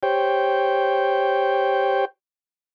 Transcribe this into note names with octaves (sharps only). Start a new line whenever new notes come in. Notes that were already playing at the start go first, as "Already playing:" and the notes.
G4 C5 C#5 G5